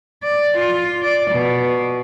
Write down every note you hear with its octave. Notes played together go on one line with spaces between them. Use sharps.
D5
F4
D5
B2